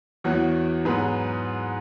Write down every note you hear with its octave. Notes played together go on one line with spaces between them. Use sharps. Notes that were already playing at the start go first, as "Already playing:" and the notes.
E2 E3 B3 F#4 C#5
G#2 F#3 B3 G#4 B4